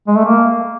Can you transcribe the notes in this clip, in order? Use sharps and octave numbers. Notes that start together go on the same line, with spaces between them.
G#3
A3
A#3